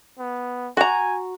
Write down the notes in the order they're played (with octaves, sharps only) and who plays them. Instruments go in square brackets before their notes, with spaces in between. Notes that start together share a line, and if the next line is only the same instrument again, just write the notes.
[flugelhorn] B3
[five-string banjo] F#4 A#5 [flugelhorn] G#5